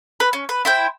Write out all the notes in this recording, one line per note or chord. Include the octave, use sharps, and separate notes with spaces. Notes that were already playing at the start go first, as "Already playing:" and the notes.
B4
C#4
B4
E4 C5 G5